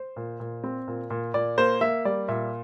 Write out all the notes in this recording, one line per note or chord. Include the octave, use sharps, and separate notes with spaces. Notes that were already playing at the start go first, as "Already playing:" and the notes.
Already playing: C5
A#2
A#2
C4
A#2
A#2
A#2 D5
A#3 C5
A#3 E5
G3 D5
A#2 E5